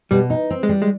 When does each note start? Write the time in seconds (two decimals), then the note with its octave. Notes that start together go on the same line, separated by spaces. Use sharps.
0.11 B2 G3
0.30 D#4
0.51 C4
0.63 G#3
0.69 G3
0.82 G#3